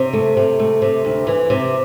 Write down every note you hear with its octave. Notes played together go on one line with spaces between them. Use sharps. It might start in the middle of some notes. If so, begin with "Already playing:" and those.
Already playing: C3
A3
C3
A3
C3
D2
E3
C3